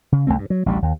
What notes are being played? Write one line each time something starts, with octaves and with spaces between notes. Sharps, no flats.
C#3
C2 G2 A3 C4
G2
F#3
A1 D2 F3 G3
D#2